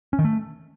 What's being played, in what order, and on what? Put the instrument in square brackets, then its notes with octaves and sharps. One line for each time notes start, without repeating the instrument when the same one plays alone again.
[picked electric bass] C#4
D#3
A3